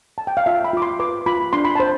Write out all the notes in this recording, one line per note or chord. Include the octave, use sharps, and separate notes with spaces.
A5
G5
F5
F4 E5
B5
F4 D6
C6
B4 D6
F4 B5
D4 C6
B5
C5 A5